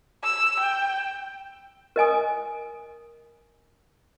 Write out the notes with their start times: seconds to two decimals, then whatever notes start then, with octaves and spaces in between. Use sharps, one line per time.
0.24 E6
0.60 G5
1.96 A#4 D#5 G#5 D#6